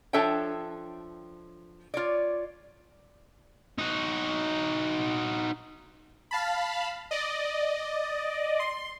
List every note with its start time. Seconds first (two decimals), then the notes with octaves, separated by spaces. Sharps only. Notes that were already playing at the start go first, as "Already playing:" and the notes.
0.13 F3 D4 A4 C#5 E5 G5
1.94 F4 C#5 D5
3.78 D#4 F#4
6.31 F5 A5 B5
7.11 D5 D#5
8.59 C6